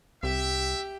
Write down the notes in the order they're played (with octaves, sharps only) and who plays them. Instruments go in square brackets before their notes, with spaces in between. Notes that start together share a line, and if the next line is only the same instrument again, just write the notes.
[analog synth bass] C2 [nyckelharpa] G4 [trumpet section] E5